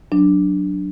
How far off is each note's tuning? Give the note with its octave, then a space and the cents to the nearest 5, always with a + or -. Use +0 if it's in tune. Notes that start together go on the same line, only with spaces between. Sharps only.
F#3 +0 D4 +0